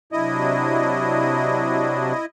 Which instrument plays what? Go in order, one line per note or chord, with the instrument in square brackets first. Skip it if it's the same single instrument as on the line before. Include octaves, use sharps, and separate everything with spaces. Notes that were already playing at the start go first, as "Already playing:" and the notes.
[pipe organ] C3 F#3 D4 [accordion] E4 D#5